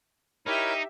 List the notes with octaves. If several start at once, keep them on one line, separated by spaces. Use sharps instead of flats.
D#4 E4 G4 A#4 C#5 E5